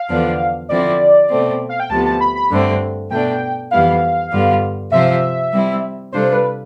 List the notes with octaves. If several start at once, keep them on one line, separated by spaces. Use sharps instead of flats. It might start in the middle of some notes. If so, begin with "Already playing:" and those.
Already playing: F5
E2 D3 F3 B3 D4
D3 F3 C4 E4 D5
B2 A3 C4
F5
G5
D2 C3 F3 B3 A5
A5
B5
B5
G2 D3 A3 C4
B2 A3 D4 G5
F2 E3 G3 B3 E4 F5
G2 D3 G3 B3 F4
C3 F3 C4 F4 C5 E5
G3 C4 E4
C3 G3 D4 F4 A4 C5
B4